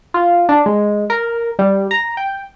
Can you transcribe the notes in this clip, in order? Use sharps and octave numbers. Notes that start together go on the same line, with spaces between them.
F4
D4
G#3
A#4
G3
A#5
G5